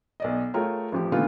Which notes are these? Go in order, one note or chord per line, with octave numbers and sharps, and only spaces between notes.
B1 D5 D#5
A3 F4 G#4 A#4 C#5 G5
A1 F3 G4
A#2 D3 D#3 A3 B3 F4